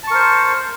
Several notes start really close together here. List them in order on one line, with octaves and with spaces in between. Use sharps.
A5 C#6 A#4 C5